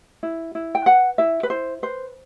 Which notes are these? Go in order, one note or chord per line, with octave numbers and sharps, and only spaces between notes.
E4
E4
G5
B4 F#5
E4 E5
B4
E4 C5
B4 C5